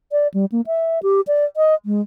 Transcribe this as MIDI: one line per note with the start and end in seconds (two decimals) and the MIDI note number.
0.12 0.28 74
0.34 0.46 55
0.52 0.61 58
0.67 0.99 76
1.03 1.21 67
1.27 1.45 74
1.57 1.75 75
1.86 2.01 56